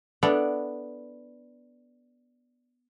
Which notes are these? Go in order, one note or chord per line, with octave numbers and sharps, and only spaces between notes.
B3 D4 E4 A4 D5